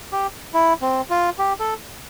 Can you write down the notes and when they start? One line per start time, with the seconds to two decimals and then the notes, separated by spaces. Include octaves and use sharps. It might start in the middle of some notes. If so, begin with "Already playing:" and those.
0.12 G4
0.54 E4
0.82 C4
1.10 F4
1.39 G4
1.59 A4